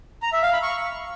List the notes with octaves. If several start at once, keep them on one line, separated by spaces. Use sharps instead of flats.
A#5
E5
F5
B5
C#6